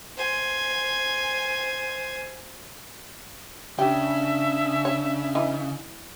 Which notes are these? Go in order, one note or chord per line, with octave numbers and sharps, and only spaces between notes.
C5 G#5
C#3 D4 G4 E5
C#5
E3 D#4